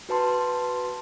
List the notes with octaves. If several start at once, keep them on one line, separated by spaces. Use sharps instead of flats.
F#4 B4 A5 C6